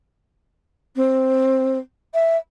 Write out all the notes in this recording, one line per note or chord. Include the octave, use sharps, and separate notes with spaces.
C4
E5